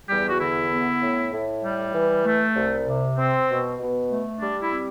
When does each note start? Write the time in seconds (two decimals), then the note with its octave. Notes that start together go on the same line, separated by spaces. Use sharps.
0.09 E2 G3 G4
0.30 F#4
0.40 D3 E4
0.71 B3
1.02 A2
1.32 A2
1.63 G3
1.94 E3
2.25 A3
2.56 C2
2.86 C3
3.17 C4
3.49 B2
3.79 B2
4.11 A3
4.41 G3 D4
4.62 E4
4.72 C4